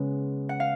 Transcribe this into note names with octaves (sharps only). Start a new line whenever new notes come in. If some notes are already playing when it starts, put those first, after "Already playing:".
Already playing: C#3 G#3 B3
F#5
F5